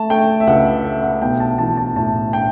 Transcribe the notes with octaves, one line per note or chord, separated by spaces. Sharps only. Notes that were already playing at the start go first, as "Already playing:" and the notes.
Already playing: A3 A5
A3 G5
E5
C#2 F#5
E5
A3 E5
F#5
B1 G5
A5
E3 A5
A5
A2 A5
G5